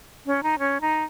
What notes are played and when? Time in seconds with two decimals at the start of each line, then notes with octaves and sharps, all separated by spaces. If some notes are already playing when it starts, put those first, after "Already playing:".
0.26 C#4
0.43 D#4
0.59 C#4
0.81 D#4